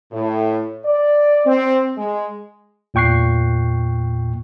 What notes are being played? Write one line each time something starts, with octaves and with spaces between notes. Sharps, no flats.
A2
D5
C4
G#3
E2 A#2 G5 C#6 F#6 C7